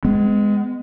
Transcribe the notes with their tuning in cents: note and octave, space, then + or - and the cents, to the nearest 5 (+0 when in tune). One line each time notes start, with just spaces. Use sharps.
G#3 +0 B3 +40